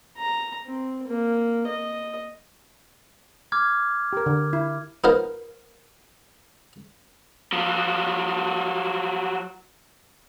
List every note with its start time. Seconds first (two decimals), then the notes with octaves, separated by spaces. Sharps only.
0.18 A#5
0.66 C4
1.07 A#3
1.67 D#5
3.52 D6 F6 G#6
4.13 G4 A#4
4.26 D3
4.53 E4
5.04 B3 D#4 F4 A#4 C5
7.52 F3 F#3